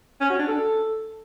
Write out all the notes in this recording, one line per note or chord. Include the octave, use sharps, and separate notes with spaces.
C#4
F#4
D4
A4